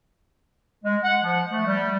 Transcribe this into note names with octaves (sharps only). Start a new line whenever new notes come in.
G#3
F#5
F3
A3
G3